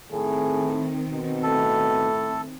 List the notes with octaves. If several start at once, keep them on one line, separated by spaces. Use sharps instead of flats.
A2 D#3 C4 G#4
B2
A2 A4